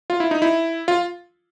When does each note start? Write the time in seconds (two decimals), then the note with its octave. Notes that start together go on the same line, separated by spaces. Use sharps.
0.10 F4
0.20 E4
0.31 D#4
0.42 E4
0.88 F4